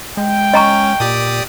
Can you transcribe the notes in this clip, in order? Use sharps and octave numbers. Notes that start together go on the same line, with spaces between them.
G#3 G5
C#4 D#5 A#5 C#6
A#2 G4 D5 D#6